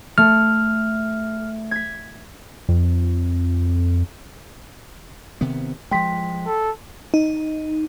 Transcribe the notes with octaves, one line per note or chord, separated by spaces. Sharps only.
A3 F6
G#6 B6
F2
C3 D#3 B3
F3 G#3 G5 C6 B6
A4
D#4